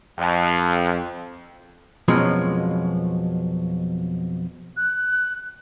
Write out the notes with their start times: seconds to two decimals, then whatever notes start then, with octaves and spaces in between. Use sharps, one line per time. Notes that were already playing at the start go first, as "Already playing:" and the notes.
0.19 F2
2.08 F2 B2 F3 F#3 G#3 C#4
4.77 F#6